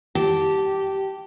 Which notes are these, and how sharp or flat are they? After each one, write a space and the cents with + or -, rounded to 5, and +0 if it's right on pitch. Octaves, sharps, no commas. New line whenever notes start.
G4 -15 A5 +0